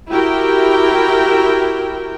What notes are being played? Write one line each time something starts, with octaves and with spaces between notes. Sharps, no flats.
E4 F#4 G4 A#4 G5